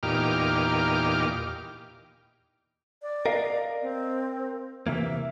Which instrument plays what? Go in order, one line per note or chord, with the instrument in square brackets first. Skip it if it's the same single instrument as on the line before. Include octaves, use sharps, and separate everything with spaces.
[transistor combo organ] E2 A#2 D#4 G4 D6 F6
[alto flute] D5
[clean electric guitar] A#4 D#5 F5
[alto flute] C4
[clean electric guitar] C3 E3 A#3 [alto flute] E5